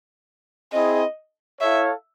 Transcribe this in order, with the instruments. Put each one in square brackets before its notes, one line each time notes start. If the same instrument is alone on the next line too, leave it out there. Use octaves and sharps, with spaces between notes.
[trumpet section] C4 E4 G#4 [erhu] D#5
[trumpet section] E4 A4 C#5 F5 [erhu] E5